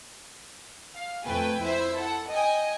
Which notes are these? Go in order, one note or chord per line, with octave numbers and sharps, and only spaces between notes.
F5
F2 A3 B4 G5 G#5
E4 C5 E5
A4 F#5
D#5 G5 G#5